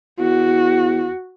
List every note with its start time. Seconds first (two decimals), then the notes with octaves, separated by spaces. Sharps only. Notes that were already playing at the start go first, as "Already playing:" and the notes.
0.20 E2 F#4